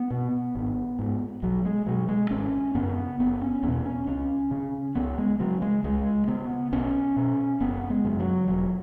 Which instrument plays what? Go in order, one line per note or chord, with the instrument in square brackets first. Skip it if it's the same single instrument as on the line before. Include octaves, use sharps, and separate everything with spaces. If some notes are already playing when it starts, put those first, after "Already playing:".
Already playing: [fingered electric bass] B3
B2
G#1
G#2
B1 F#3
G#3
B2 F#3
G#3
G#1 C#4
F#2 C#3 B3
F#1 B3
C#4
E2 B2 B3
C#4
C#2 C#4
C#3
C#2 B3
G#3
C#3 F#3
G#3
C#2 G#3
C#3 B3
B1 C#4
B2
F#1 B3
G#3
F#2 C#3
F#3
E1 F#3